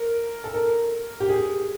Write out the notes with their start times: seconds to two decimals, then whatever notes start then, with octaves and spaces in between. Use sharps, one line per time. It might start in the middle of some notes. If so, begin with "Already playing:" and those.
Already playing: A#4
0.44 A4
0.54 A#4
1.20 G4
1.29 G#4